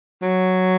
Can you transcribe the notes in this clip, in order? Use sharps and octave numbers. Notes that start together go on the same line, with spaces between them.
F#3